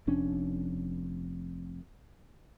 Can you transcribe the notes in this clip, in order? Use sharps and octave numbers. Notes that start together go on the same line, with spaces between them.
F1 F2 C#4 D4